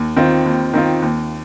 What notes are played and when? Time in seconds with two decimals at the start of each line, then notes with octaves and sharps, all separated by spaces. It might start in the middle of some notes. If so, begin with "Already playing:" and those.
Already playing: D#2
0.16 D#3 C4 F4
0.46 D#2
0.73 D#3 C4 F4
1.02 D#2